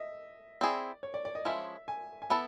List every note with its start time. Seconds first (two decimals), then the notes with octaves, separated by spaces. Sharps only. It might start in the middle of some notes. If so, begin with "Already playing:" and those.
Already playing: D#5 E5
0.61 C4 E4 G#4 D5
1.03 C#5
1.14 D5
1.25 D5
1.35 D#5
1.45 F3 G#3 C#4 E4 E5
1.88 G#5
2.22 G#5
2.30 B3 E4 A4 A5